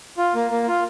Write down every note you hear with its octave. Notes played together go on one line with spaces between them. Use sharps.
F4
A#3
A#3
F4